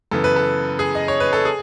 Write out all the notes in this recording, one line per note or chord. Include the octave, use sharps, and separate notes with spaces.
F#2 C#3 E3 B3 A4
B4
A4
G#4
D#5
C#5
B4
A4
G#4